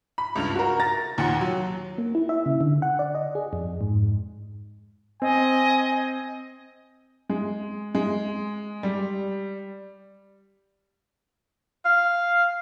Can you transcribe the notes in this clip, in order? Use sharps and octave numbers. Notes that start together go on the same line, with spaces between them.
B5
C#2 G2 F7
F#4 A#4
A#5 A6 A#6
D#2 A#2 F#5 C#7
F#3
A#3
E4
E5
C#3
D3
F#5
D5
D#5
G#4
F2
G#2
C4 D#5 G#5
G#3
G#3
G3
F5